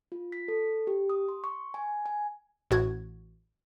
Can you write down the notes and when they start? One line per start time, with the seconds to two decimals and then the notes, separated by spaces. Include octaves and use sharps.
0.12 F4
0.32 B6
0.48 A4
0.87 G4
1.10 D#6
1.29 C6
1.44 C#6
1.74 G#5
2.06 G#5
2.71 A1 A2 F#4 G#6